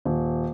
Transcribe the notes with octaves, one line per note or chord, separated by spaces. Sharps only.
D#1